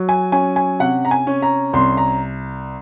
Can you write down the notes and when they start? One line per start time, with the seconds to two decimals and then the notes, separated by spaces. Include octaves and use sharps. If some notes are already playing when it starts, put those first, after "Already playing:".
Already playing: F#3
0.09 G#5
0.32 C#4 G#5
0.56 G#5
0.80 C3 F#5
1.05 A#5
1.11 G#5
1.27 C#4
1.42 A#5
1.73 C2 C6
1.97 A#5